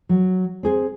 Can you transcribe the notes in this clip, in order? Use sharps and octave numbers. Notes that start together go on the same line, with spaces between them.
F#3
C4 G#4 C5